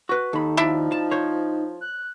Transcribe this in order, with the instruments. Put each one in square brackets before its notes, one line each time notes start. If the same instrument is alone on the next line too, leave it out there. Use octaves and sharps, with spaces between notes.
[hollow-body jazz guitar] F#4 B4
[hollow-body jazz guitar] D#2 B5 [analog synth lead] D#4 [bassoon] A4
[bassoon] F3 [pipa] D4 E4
[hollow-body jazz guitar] A5
C5 C#5
[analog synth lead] F#6